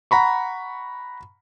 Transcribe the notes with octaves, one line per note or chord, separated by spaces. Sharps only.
F#5 A#5 B5 C#6